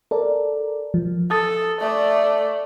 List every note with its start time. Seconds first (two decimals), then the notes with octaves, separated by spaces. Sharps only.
0.11 A4 A#4 D5
0.94 F3
1.30 A4 A5 D#6 A6
1.81 A3 D5